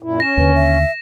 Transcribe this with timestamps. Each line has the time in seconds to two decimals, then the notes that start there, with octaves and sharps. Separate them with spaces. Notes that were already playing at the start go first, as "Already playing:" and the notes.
0.02 F#2 A#2 E4
0.20 C#4 A#6 E7
0.37 D#2 D3 B4
0.55 E5